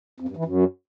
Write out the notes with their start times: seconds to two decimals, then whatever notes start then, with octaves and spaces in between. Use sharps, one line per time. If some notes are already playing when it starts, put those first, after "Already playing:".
0.20 F2
0.28 G2
0.37 E3
0.45 F#2